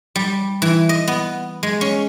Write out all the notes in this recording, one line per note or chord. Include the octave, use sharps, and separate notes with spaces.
G3
E3
D#5
B3
G#3
C#4